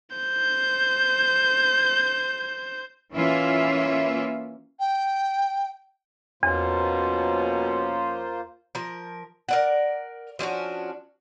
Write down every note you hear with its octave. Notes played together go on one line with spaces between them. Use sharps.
C5 G6
E3 A#3 C#4 E4 F4 E5
G5
E2 B2 F3 A#3 C#4 F4 C5
F3 A#4
A#4 D5 F#5
F3 C#4 D4 F#4